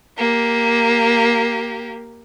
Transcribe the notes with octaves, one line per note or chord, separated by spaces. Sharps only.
A#3 G4